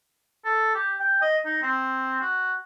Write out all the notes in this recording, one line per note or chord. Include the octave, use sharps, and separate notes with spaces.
A4
G4
G5
D#5
D#4
C4
F#4